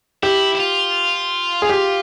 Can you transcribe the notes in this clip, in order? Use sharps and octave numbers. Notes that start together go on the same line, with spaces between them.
E4 G4
E4
F4
G#4
G4